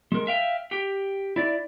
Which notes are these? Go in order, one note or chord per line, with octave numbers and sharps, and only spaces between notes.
G#3 A#4
E5 F5 G5
G4 G5
E4 D5